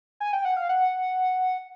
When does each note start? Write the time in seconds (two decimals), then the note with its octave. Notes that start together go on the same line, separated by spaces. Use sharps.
0.20 G#5
0.33 G5
0.45 F#5
0.57 F5
0.69 F#5